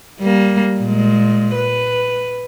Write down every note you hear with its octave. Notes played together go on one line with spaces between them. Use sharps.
G3 A#3
A#2 G#3
B4